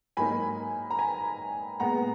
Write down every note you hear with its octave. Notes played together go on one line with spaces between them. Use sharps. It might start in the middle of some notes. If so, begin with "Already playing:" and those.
G#2 F#3 A#3 D#4 G#5 B5
A#5
G#5 B5
A#2 G#3 B3 F#5 A#5